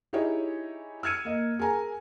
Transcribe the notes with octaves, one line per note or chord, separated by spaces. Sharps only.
D#4 E4 G4 G#4 C#5 D#5
E6 F6 G#6 C#7 D#7
A#3 D#5
G#4 A#4 G#5 A#5